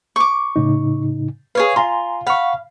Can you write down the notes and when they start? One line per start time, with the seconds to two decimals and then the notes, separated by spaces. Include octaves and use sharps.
0.16 C#6 D6
0.56 A2 C#3 D#4
1.55 G#4 B4 C#5 F5
1.76 F4 G#5 A#5 C6
2.27 F5 F#5 B5 C#6